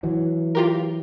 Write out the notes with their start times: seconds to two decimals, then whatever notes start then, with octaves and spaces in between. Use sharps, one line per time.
0.03 E3 F#3
0.55 F4 G4 A#4